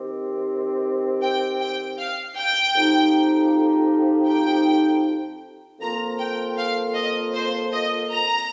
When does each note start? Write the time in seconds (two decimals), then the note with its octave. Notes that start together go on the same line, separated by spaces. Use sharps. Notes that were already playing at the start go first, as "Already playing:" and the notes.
Already playing: D#3 C4 G4
1.22 G5
1.61 G5
1.98 F5
2.37 G5
2.75 F2 F3 D#4 G4
4.27 G5
5.80 F2 F3 A#3 F4 A#4 A#5
6.18 G5
6.57 F5
6.95 D#5
7.34 C5
7.72 D#5
8.10 A#5